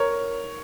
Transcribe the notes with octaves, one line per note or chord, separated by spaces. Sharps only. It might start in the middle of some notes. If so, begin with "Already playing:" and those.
Already playing: A#4 C#5